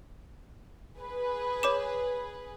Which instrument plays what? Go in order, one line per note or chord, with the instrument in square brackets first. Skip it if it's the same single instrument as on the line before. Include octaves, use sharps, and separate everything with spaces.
[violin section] G#4 B4
[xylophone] C#5 D6 E7